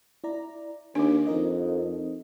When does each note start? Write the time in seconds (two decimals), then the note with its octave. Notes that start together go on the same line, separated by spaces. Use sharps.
0.24 E4 D5 A#5
0.95 D#2 D4 G#5 D6
1.27 F2 D#4 A#4 D#5